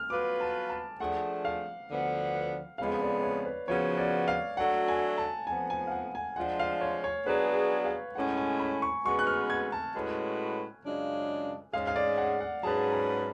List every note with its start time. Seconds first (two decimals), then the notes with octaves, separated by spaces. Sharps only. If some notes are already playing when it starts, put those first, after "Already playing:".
Already playing: F6
0.10 F#3 B3 F4 B4 D6
0.41 A5
0.70 A5
1.00 F3 A3 D4 G#4 F#5
1.45 F5
1.89 D2 D3 F3 B3
2.78 F2 C#3 G#3 B3 F5
3.01 D5
3.23 C#5
3.45 B4
3.68 C#3 F3 B3 F#4 C#5
3.98 D5
4.28 F5
4.57 F#3 A3 D4 F#4 A4 F#5
4.88 G#5
5.18 A5
5.47 F2 F3 B3 G#5
5.70 G#5
5.87 F5
5.91 F#5
6.15 G#5
6.36 F3 G#3 D4 F4 F#5
6.59 F5
6.81 C#5
7.04 C#5
7.26 F#3 B3 D4 G#4 B4
7.85 F5
8.15 A2 G#3 C#4 F#5
8.37 G#5
8.60 B5
8.82 C#6
9.05 C#3 G#3 B3 F#4 B4 C#6
9.19 F#6
9.27 F6
9.50 G#6
9.72 A5
9.94 A2 G#3 C#4 F#4 B4
10.84 F#2 C#3 G#3 D4 F4
11.73 G#2 G#3 C#4 G#4 F5
11.87 F5
11.96 D5
12.18 F#5
12.40 F#5
12.63 G#2 F#3 C#4 G#4 B4 A5
12.93 A5